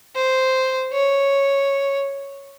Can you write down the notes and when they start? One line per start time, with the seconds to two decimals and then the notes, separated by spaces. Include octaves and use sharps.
0.15 C5
0.92 C#5